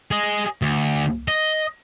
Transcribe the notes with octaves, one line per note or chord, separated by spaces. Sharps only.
G#4 D#5
D2
D#5